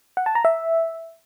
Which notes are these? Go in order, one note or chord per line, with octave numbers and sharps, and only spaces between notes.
F#5
A5
A#5
E5